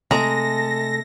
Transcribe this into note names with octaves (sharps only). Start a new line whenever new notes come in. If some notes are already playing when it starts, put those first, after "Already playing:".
C3 G#3 A3 A4 A#5 A#6